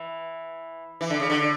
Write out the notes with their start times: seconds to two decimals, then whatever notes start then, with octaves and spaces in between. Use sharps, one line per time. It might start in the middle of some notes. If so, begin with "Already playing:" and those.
Already playing: E3
1.01 E3
1.10 D3
1.20 C#3
1.30 D3